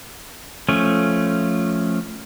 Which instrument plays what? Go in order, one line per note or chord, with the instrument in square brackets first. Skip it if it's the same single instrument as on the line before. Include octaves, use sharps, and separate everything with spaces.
[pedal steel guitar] F3 A3 C#4